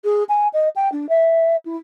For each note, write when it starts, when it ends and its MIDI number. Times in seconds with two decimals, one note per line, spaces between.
0.04 0.24 68
0.29 0.48 80
0.53 0.69 75
0.76 0.89 79
0.92 1.09 62
1.09 1.56 76
1.65 1.77 64